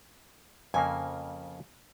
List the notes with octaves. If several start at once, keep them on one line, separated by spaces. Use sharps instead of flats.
F2 C#3 A#3 G#5